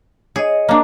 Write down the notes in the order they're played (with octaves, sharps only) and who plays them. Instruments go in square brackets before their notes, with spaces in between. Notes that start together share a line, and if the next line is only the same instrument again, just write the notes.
[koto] G#4 [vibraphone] C#5 D#5
[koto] A#3 D4